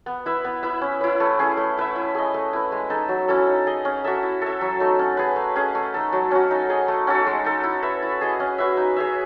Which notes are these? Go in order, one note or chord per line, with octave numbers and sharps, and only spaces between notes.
B3
E4 B4 E5
B3
E4 B4 E5
C#4
E4 B4
A3
C#4 G#4
A3
E4 B4 E5
E4
G#4 D#5
A3
E4 B4
G#3
D#4 A4
F#3
C#4 E4 A4
D#4
G#4 D#5
C#4
F#4 A4 E5
E4
A4 E5
F#3
A3 D#4
C#4
G#4 B4
A3
C#4 G#4
A3
D#4 A4
F#3
C#4 F#4
D#4
G#4 D#5
A3
C#4 F#4 A4
G#3
D#4 A4
E4
B4 E5
E4
G#4 D#5
C#4
F#4 B4 E5
D#4
G#4 C#5 E5